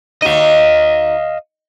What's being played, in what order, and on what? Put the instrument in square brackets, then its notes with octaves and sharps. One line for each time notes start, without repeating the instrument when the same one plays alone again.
[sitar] D#4 F#4 [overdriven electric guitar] D#5 F5